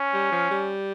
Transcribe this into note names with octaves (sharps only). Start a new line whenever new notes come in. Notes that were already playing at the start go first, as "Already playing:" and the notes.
Already playing: C#4
G3
F3
G3